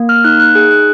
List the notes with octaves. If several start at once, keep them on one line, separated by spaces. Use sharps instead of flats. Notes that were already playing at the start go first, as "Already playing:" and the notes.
Already playing: A#3
F6
D#4 F#6
F#6
G#4 F#6
F#6